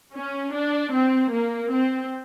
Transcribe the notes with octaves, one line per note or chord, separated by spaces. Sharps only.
C#4
D4
C4
A#3
C4